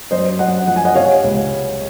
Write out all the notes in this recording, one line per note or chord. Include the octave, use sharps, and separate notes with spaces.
F#2 C5 D#5
F#2 D#5 F#5
F3 F#5
G#5
D#5 F#5
C3 C#5 F5
C#2